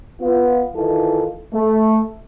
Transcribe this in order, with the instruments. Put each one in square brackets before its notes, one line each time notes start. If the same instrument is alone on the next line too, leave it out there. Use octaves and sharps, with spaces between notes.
[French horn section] B3 F4
D#3 E3 F4 A4
A3